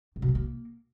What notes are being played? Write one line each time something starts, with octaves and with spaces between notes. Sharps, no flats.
A2
B2
G#3
A#3